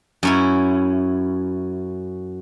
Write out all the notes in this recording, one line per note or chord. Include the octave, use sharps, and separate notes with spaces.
F#2 C#4 E4